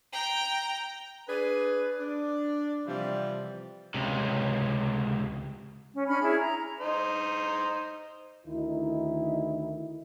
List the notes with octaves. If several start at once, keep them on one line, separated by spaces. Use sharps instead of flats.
G5 A#5
D4 G#4 B4
D4
C3 E3 F3 G3
C#2 C3
C#4
C#4 D4 B5 F6
E4 G#4
A#5
D#4 C5
D2 D#3 D#4 E4